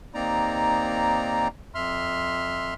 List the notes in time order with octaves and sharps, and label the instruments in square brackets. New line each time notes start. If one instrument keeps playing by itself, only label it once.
[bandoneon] D#2 A#3 C4 D#4 D5 A#5
F2 E5 C6 F6